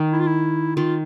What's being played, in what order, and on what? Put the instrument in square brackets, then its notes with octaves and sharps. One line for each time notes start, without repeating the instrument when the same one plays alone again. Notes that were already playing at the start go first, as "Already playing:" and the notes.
Already playing: [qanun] D#3
[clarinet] E4
F4
E4
[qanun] D#3 [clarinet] F4